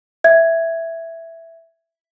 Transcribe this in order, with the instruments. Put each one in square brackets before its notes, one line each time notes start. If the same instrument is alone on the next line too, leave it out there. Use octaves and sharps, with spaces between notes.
[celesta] E5 G#6